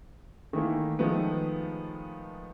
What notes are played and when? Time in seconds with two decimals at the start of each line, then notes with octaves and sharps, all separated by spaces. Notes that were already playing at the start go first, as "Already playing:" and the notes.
0.53 D#3 E3 A3 A#3
0.99 D#3 F3 G#3 A3 B3